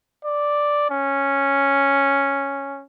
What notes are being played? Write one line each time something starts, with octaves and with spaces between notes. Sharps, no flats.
D5
C#4